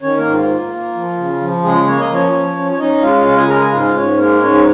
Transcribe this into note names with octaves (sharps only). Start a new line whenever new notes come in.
D#3 C#4 C#5
A#3 A#4
G#2
F4
A#3
A#3
F3
C#3
F3
C#3 G#3 G#4
A#3 C#5
D#5
F3 C#4 C#5
F3
C#4
C#5
C#4 D#4 D#5
G#3 F4 F5
C#3 F4 F5
G#4 G#5
G#3 A#4 A#5
G#4 G#5
G#2 F4 F5
G#2 C#4 C#5
G#3 A#3 A#4
G#2 C#4 C#5
D#4